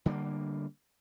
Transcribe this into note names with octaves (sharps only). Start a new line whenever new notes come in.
D3 G3 G#3 A#3